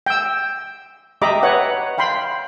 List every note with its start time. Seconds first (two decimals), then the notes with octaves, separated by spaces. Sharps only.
0.06 G5 E6
1.22 G4 D#5 E5 A#5 B5 D6
1.43 B4 C#5 F#5
1.98 F5 G5 B5 C6